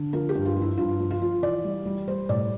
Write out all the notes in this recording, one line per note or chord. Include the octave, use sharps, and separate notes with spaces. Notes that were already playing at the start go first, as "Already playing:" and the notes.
Already playing: D3
F3 A#4
G4
G2
F4
F3
E4
G2 F4
F3
F4
F3
E3 D5
G3
G3
G3 C5
A2 D5